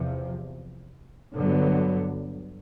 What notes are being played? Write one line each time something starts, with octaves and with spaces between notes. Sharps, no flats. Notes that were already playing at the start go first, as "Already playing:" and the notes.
Already playing: E2 C3 F3
G2 D3 F#3 B3